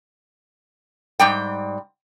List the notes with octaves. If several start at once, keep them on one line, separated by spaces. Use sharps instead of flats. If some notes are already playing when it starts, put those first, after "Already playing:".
G#2 G3 G5